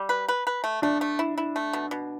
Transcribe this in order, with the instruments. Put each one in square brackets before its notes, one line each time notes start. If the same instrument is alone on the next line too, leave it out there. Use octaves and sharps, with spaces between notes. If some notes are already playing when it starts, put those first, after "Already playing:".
Already playing: [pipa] G3
B4
B4
B4
A3
[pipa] A3 [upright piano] D4
[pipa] A3
E4
E4
A3
B2
B2